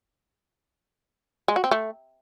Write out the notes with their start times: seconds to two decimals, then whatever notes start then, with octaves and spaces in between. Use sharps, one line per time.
1.48 G#3
1.56 F#4
1.64 C4
1.71 A3